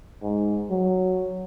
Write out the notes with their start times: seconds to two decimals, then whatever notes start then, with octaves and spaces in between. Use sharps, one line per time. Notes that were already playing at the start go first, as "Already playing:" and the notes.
0.23 G#2
0.70 F#3